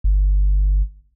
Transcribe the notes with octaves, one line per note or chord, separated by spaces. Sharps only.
G1